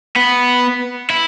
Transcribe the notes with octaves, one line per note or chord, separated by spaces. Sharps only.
B3
E4